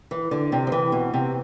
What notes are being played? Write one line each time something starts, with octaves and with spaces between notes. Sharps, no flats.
E3
D3
C3
F3
E3
B2
C3